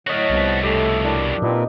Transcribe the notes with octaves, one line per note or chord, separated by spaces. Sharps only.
A2 F#3 A3 F#4 C#5 D#5 F5
C2 F3 B3
F2 B2 A3 G4 A4 E5
A#3 D4 E4
A#2 C4 D#4 A#4 B4